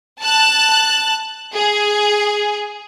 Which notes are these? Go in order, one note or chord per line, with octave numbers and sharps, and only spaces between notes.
A5 F#6
G#4